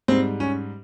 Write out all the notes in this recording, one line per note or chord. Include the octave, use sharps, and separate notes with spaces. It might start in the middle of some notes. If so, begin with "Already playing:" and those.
G#2 G3 C4
C#4